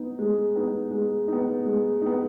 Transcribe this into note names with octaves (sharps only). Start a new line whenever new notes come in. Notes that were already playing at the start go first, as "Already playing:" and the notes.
Already playing: B3 D#4
G#3
B3 D#4
G#3
B3 D#4
G#3
B3 D#4